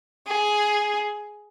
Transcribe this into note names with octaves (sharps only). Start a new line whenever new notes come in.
G#4